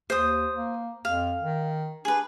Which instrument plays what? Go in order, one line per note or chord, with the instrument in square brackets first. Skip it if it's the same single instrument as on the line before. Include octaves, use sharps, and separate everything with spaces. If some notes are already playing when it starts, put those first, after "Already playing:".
[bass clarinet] D#2 [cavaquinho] C5 D#6
[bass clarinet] A#3
[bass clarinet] F2 [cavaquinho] F5
[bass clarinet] D#3
[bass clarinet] D4 [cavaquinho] G#4 B4